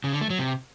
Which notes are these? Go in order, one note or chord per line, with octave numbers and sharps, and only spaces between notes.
C#3
D3
A3
F#3
C3